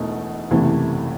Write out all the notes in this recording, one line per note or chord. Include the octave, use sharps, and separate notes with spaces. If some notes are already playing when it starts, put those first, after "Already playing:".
Already playing: E1 E2 B2 A3 D#4
F#1 E2 C3 E3 A3 E4